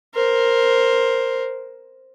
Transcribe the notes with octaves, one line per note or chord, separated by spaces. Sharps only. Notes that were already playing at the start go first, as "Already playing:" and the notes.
A#4 C5